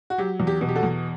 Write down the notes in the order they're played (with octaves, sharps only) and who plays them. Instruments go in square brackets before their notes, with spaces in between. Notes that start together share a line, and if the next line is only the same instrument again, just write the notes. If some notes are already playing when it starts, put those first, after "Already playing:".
[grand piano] F#4
F#3 G4
E2
G4
B2
G4
F#4 A4
E2